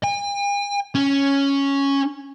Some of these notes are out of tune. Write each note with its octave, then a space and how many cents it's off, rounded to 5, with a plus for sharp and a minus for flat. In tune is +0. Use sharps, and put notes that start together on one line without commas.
G#5 -45
C#4 +0